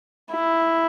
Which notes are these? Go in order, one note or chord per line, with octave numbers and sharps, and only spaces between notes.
E4